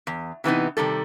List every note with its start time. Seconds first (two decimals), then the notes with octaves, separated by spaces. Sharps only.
0.07 E2
0.44 C3 E3 B3 D#4
0.77 C3 D#3 G3 A4